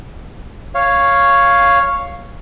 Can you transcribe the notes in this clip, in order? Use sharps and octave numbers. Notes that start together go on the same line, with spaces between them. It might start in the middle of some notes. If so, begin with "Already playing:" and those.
C#5 F5